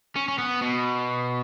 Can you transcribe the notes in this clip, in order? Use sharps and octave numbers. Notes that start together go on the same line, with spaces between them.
C#4
C#4
B3
B2